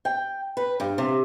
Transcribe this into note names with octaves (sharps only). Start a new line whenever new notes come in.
G5
B4
G2
C3